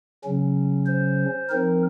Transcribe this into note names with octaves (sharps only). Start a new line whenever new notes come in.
C#3 F#3 C#4
C5
F3 C4 D#4 A#4